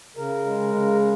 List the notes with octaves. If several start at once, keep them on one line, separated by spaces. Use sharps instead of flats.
C#3 A#4
G#3
C#3